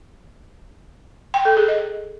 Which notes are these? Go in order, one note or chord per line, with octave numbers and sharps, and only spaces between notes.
G5
A4
G#4
D#5